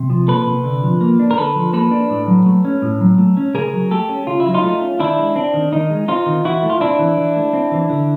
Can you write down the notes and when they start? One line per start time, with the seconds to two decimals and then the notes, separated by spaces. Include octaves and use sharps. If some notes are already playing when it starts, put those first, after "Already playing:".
Already playing: C3
0.10 F3
0.28 A#3 A4 B4
0.47 C3
0.64 D3
0.83 F3
1.01 A#3
1.19 D4
1.31 A#4
1.37 D3 A4 B4
1.56 F3
1.73 A#3 A4 B4
1.91 D4
2.10 A2
2.28 F#3
2.46 A3
2.65 C#4
2.82 A2
3.01 F#3
3.18 A3
3.37 C#4
3.54 C#3 G#4 A#4
3.73 F#3
3.91 A3 G4 A4
4.09 C#4
4.27 C#3 F4
4.40 E4
4.46 F#3
4.54 D#4 F4
4.63 A3
4.81 C#4
4.99 D#3 D4 E4
5.18 G#3
5.36 C4 D4
5.54 D#3
5.72 D#3 D#4
5.90 G#3
6.08 C4 D#4 F4
6.26 D#3
6.45 E3 E4 F#4
6.63 A3
6.70 F4
6.80 C4 D4 E4
6.99 E3
7.18 E3
7.36 A3
7.53 C4
7.72 E3
7.89 D3